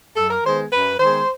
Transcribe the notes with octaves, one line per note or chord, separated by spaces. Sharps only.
F#2 A4
A#4
D#3 G#3 B3 C5
F#2 B4
D#3 G#3 B3 C5